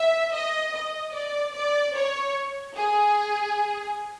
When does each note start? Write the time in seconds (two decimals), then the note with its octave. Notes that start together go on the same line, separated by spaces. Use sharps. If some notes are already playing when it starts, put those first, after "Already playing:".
Already playing: E5
0.33 D#5
0.74 D#5
1.14 D5
1.54 D5
1.94 C#5
2.75 G#4